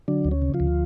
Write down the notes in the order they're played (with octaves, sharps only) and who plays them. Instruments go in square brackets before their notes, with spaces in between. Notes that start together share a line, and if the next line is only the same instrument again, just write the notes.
[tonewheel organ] D3 F#3 D4
D2
C#4
C#3
F3 F4
D2